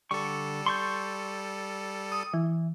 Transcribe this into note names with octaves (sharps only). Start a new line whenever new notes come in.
D3 G3 A4 C#6
C6 C#6 G6
D#6
E3